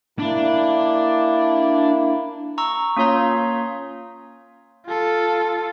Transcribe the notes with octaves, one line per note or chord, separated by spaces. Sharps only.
A#3 D4 E4
A#5 C#6 E6
A#3 C#4 F4 C#5 F5 A#5
F4 A4